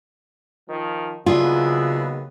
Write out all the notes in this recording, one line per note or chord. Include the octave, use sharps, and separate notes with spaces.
D#3 F3
D#2 C#3 F#3 B3 D4 E4 F4 G#4